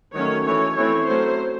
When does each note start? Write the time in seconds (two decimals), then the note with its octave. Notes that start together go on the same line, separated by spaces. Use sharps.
0.15 D#3 F#3 A3 C#4 C#5
0.46 E3 A3 C#4 C#5
0.77 E3 A3 C4 C#5
1.08 F#3 A3 C#4 C5